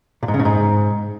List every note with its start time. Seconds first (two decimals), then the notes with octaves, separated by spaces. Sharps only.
0.23 A#2
0.28 G#2
0.34 C#3
0.40 A2
0.45 G#2